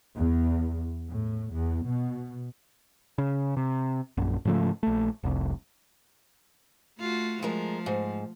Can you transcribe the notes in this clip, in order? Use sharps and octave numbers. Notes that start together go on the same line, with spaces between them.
E2
A2
E2
B2
C#3
C3
A#1 F#2
G#2 C#3 F3 A3
A#1 A3
F1 C2
A3 F4 F#4
F3 G#3 A3 A#4
G#2